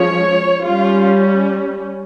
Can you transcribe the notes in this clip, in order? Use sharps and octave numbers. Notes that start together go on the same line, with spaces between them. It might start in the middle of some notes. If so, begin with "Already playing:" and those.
Already playing: F3 G#3 C#4 C#5
G3 C#4 F4